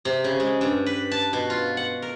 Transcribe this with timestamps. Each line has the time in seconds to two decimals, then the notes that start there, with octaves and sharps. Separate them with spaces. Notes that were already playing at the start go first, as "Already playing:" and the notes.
0.05 C3
0.24 C#3
0.40 G#3
0.61 G2
0.86 B4
1.11 A5
1.33 B2
1.50 F4
1.77 F#5
2.02 A#4